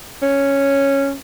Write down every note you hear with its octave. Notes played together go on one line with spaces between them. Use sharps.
C#4